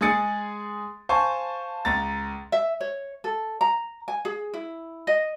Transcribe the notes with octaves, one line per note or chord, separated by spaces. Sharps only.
G#3 G#4 G#5 D#6 A6 C#7
C5 F5 G#5 A5 C#6
C#2 A#5 A6
E5
C#5
A4
A#5
G#5
G#4
E4
D#5